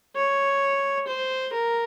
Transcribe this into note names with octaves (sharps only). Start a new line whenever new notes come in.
C#5
C5
A#4